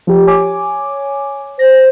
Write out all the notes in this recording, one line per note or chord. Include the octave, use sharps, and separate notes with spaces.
F3 G4
C#5 G#5 D6
C5 A#6